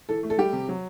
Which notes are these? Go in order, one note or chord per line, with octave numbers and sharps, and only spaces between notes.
E3 A4
A3
A4
G3 G4
C3
F#3